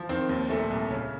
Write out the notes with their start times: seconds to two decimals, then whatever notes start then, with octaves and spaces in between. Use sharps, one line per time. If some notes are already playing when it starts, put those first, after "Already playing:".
Already playing: F3
0.09 D#3 C4
0.29 D#2
0.50 A#2 A3
0.70 C2
0.91 C#3